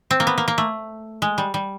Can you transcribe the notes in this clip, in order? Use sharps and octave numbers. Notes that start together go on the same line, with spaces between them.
C4
A#3
B3
A#3
A#3
A3
G#3
G3
G3